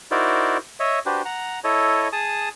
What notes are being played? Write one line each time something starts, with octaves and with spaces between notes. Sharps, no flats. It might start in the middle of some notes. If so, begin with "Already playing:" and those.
D#4 E4 F#4 A#4 C5 D5
C#5 D#5 E5
D4 F#4 G4 B4 C5
F#5 A#5
E4 A4 C#5 D#5
G#4 A5 D#6